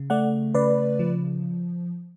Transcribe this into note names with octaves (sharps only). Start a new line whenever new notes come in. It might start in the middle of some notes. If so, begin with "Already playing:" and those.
Already playing: C#3
A3 D5 F#5
C#3 B4 D5
F3